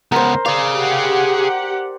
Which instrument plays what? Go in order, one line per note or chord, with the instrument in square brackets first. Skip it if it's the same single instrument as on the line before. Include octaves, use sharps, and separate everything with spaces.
[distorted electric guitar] C#2 B3 [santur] A#4 C5
[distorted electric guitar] G#4 F5 [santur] D5
[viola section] G4 F#5